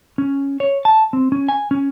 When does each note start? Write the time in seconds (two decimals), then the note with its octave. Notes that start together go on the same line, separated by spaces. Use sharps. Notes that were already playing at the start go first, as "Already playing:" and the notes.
0.18 C#4
0.60 C#5
0.85 A5
1.13 C4
1.32 C#4
1.49 G#5
1.71 C#4